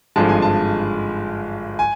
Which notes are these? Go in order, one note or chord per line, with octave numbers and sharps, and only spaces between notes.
G#1 G2 D3 F3 G#3 A5
G#5
A5
G#5